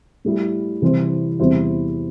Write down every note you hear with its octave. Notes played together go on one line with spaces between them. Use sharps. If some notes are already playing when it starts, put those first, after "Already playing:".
A2 G3 E4
C3 E3 G3 E4 C5
E2 C3 G3 E4 C5